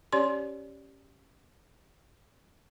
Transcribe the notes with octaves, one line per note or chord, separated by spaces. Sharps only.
C#4 G4 C#5 D5 C6